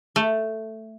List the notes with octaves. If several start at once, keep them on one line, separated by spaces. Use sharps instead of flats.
A3